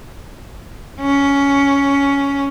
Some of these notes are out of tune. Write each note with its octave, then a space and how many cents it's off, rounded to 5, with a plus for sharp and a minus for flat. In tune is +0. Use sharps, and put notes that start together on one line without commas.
C#4 +10